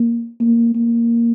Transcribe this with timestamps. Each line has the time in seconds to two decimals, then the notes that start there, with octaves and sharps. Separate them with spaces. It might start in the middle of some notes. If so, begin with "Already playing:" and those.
Already playing: A#3
0.40 A#3
0.75 A#3